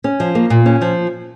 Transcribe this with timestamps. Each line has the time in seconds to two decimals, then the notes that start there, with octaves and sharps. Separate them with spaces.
0.04 C#4
0.20 F3
0.35 A#3
0.50 A#2
0.66 C#4
0.81 F3